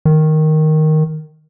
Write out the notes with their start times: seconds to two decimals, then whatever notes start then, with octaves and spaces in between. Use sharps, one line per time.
0.05 D#3